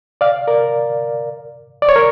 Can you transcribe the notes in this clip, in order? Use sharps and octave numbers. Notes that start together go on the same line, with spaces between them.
D5 F5
A#4 D5
D5
C#5
A#4